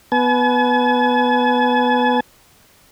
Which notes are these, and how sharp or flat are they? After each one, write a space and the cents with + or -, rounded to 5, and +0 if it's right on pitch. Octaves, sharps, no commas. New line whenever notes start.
B3 +0 G#5 +45